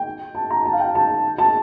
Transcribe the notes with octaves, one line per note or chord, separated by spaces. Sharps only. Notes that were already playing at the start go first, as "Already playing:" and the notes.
Already playing: G5
A5
A#5
A5
F5
G5
A5
A5